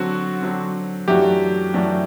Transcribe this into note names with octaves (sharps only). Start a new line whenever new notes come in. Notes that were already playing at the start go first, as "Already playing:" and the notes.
Already playing: D3 F#3 C4 F#4
D3 F#3 C4
F#2 E3 A3 D4 F#4 G4
F#2 E3 A3 D4 F#4